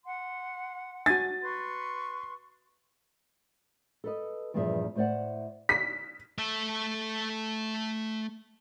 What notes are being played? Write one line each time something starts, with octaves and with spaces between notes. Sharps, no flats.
F#5 C6
F#4 G#5 A6
B4 C6 C#6
A4 B4 D#5
E2 G2 A#2 F3 G#4 E5
A2 C5 D5 F#5
B6
A3 E5